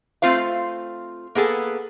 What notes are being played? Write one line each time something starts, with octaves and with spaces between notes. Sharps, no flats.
A3 C4 F4 C5 F5
A#3 B3 G#4 A4